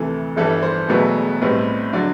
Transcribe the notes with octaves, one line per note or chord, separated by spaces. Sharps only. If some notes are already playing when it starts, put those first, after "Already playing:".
Already playing: D2 C3 E3 A4
G1 G2 E3 G3 A4
C5
E1 E2 B2 F#3 A3 B4
B1 A2 G3 C4 B4
D3 F#3 D5